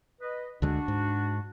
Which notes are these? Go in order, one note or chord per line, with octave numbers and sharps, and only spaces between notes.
B4 D#5
D2 D3 G#3 D4 F#4
G#2